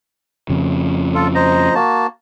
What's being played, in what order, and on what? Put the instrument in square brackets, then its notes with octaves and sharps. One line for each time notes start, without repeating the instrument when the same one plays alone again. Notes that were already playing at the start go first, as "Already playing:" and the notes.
[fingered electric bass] F2 C#3
[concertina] F4 A4
C5 D#5 A#5
A#3 F#4 A5